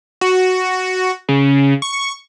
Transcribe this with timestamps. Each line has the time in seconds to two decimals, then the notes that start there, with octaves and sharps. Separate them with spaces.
0.21 F#4
1.29 C#3
1.82 C#6